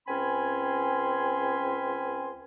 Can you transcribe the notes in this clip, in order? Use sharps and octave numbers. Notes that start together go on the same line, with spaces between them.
C#2 C4 C#4 G#5 B5 C6